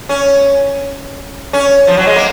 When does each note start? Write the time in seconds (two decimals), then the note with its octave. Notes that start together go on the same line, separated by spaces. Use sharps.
0.09 C#4
1.53 C#4
1.87 F3
1.97 F#3
2.07 G#3
2.16 A#3